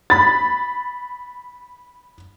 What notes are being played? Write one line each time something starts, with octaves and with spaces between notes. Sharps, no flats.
B5 A6